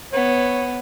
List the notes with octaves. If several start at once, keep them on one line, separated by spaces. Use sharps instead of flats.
B3 C#5